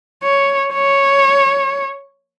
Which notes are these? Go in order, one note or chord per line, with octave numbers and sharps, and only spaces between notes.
C#5
C#5